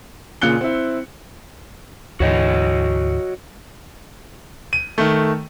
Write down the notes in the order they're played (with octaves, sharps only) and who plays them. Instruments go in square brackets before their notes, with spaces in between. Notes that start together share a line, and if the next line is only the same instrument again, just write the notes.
[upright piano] A#2 C#3 F4 F#6 C#7 G7
C4 E4
[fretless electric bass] D2 G#2 E3 [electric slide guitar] F#4 C#5 D#5
[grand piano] D#7
D#3 A3